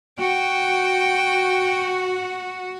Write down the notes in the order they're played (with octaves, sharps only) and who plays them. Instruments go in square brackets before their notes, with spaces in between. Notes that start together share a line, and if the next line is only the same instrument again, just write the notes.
[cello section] F#4 [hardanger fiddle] G5